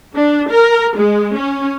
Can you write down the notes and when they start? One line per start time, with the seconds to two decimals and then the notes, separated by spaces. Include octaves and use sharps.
0.15 D4
0.50 A#4
0.97 G#3
1.35 C#4